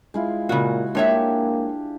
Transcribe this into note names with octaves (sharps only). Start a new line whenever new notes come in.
G#3 E4 F4
A#2 C#3 F#4
G#3 A#3 D4 G4 C#5 E5